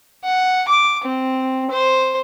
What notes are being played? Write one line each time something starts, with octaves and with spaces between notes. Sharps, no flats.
F#5
D6
C4
C5